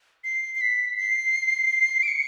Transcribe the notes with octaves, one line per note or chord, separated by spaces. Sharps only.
C7
C7
B6
C7
D7
C#7